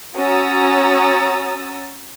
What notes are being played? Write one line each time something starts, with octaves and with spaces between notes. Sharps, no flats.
C#4 F#4 A#5 D#6 E6 A6